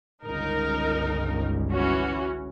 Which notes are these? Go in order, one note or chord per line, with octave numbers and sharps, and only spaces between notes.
G1 C#2 D#4 A#4
E3 C#4 F#4